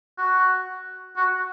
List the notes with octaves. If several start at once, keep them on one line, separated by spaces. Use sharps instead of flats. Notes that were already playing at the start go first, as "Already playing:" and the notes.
F#4
F#4